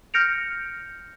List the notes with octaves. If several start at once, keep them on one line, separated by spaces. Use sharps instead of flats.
F6 G6 A#6 C#7 D7 F7